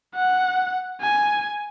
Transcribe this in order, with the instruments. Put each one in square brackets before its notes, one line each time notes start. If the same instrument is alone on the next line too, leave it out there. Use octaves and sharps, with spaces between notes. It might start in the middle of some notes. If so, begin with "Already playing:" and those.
[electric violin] F#5
G#5